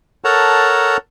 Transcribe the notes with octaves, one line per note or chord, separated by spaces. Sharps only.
A4 A#4 C#5 F#5 A5 A#5